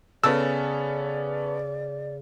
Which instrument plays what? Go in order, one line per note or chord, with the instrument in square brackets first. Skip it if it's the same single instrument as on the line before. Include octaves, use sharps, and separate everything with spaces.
[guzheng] C#3 [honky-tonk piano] B3 C#4 A4 [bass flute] D5 [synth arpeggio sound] E6